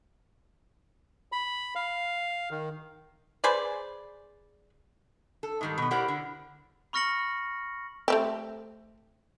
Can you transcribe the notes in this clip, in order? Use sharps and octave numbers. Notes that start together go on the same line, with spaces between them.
B5
F5
D#3
G#4 B4 C5 D5
A4
G#2 D#3 G3
B2 B3
E4 G4 A#4 C5 D5 F#5
D3
B5 C#6 F6 A#6 C#7 F#7
A3 C4 G4